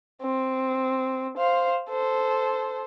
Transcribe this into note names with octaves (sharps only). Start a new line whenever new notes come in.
C4
C5 F5
A4 C5